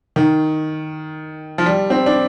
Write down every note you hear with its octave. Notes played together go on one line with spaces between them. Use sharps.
D#3
F3
G3
C4
D4